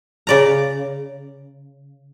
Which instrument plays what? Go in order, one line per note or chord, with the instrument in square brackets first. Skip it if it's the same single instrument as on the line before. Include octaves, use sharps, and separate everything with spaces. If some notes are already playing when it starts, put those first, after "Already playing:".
[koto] C#3 D5 A#5